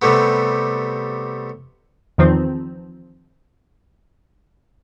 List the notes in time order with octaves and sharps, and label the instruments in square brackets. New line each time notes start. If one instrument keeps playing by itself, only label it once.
[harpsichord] C3 G3 A3 B3
[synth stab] E2 D#3 F3 C4